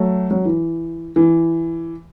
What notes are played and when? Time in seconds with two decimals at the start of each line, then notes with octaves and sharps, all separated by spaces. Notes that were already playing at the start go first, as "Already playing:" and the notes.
Already playing: F#3 A3
0.31 F#3
0.45 E3
1.16 E3